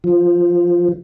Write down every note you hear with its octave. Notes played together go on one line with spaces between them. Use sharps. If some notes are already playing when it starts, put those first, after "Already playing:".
F3